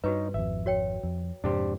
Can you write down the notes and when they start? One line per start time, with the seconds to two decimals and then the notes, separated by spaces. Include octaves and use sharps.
0.04 G2 D#4 F#4 B4 C#5
0.34 G#1 F2 E5
0.66 F#4 C#5 G5
1.03 F2
1.44 F2 G#2 C3 D4 G4 C5